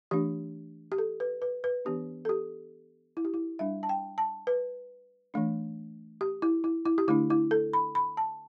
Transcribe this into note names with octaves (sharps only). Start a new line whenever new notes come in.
E3 A3 D4 G4
G4
A4
B4
B4
B4
E3 B3 D4 G4
A4
G4
E4
G4
E4
G3 D4 E5
A5
G5
A5
B4
E3 A3 D4
G4
E4
E4
E4
G4
D3 A3 D4 E4
E4
A4
B5
B5
A5